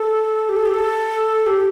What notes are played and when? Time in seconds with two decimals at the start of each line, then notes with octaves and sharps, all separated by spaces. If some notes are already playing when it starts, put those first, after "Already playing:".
Already playing: A4
0.49 G4
0.56 A4
0.66 G4
0.74 A4
1.46 G4